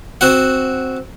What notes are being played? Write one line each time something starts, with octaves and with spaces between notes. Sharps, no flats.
C4 F#4 F#5